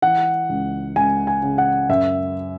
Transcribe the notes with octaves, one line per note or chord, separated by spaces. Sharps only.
E3 F#5
C#2
C#2 G#5
G#5
C#3
F#5
F#2 E5